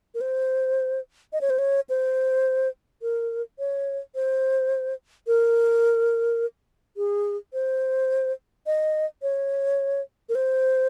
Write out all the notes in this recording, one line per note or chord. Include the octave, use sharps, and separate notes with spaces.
A#4
C5
D#5
C#5
C5
C#5
C5
A#4
C#5
C5
A#4
G#4
C5
D#5
C#5
A#4
C5